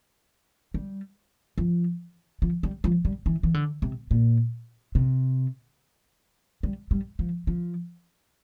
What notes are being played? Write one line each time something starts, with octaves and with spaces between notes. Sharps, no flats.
G3
F3
F3
G3
F3
G3
E3
E3
D3
C3
A#2
C3
G3
G3
F3
F3